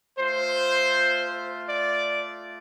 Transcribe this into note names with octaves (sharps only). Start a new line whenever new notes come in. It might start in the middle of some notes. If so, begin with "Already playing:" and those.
A3 F4 C5
D5